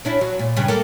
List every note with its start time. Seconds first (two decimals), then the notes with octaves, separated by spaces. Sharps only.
0.05 C#4 D4 E4
0.21 F#3
0.39 A#2
0.56 G2 C#3
0.68 A#3 A4